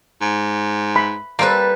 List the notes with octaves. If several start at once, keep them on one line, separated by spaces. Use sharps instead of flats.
G#2
B5
G3 A#3 C4 A4 B4